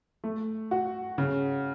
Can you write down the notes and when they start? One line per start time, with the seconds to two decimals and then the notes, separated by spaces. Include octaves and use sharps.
0.24 A3
0.71 F#4
1.18 C#3